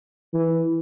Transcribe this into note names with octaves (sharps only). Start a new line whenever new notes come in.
E3